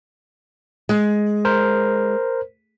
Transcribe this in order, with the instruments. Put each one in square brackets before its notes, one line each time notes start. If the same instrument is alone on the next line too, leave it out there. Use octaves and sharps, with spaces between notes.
[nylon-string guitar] G#3
[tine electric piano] A#4 C5